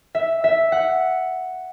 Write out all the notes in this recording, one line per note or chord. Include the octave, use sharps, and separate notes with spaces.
E5
E5
F#5